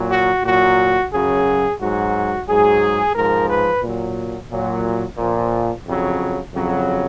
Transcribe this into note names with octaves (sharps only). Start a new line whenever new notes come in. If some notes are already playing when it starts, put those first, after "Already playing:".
Already playing: A#2 F#3
F#4
A#2 F#3 F#4
F#2 C#3 F#3 G#4
G#2 F#3 F#4
G#2 F#3 G#4
G#2 F3 A#4
B4
A#2 F#3
A#2 F#3
A#2 F3
F2 C#3 F#3
F2 C#3 F#3